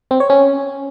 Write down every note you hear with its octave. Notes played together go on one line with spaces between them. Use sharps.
C4
C#5
C#4